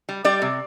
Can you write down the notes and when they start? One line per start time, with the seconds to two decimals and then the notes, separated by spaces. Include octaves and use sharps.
0.09 G3
0.25 G3 D5
0.42 C3